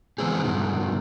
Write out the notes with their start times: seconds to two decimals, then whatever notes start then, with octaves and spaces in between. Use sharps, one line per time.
0.18 E3 G#3 B3 C4 G#4
0.44 G2 B2 D#3